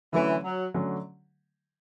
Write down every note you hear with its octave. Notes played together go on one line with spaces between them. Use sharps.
D3 E3 F#3 A3 C#4
F#3
D3 F#3 A3 C#4